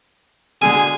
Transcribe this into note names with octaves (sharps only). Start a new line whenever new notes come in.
B2 D3 G#3 G#4 G#5